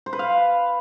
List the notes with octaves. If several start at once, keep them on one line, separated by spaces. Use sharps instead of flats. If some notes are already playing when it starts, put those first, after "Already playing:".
C5
B4
F5